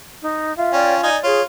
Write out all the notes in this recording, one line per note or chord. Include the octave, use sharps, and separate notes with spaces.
D#4
F4 E5
C#4 C#5 D5 G5
D#4 D5 G#5
F4 G#4 C#5